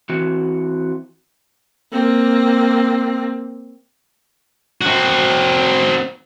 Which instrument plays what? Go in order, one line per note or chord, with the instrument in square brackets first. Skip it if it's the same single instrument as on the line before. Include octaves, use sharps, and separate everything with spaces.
[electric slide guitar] E3 C4 F#4
[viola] A#3 C4
[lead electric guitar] C4 F#4